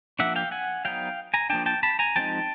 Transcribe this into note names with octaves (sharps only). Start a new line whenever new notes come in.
F3 A#3 D4 E5 F#5
F5 G5
F#5 G#5
F#3 B3 D#4 F5 G5
G#5 A#5
F3 A#3 D4 G5 A5
G5 A5
A5 B5
G#5 A#5
F3 G#3 C4 D#4 G5 A5